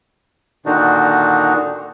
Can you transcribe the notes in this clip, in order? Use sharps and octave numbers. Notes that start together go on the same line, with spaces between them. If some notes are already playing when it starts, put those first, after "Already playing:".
A#2 D3 D#3 D4 D#4 F#4